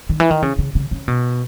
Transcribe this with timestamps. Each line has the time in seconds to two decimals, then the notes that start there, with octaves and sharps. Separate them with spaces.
0.09 D#3
0.20 E3
0.31 D#3
0.42 C#3
0.58 C#3
0.75 C#3
0.91 C#3
1.08 B2